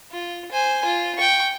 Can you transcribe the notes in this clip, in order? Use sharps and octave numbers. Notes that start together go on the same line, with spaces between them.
F4
C5 G#5
F4
G5 C#6